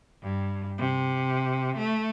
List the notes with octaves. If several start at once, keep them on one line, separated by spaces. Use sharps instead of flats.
G2
C3
A3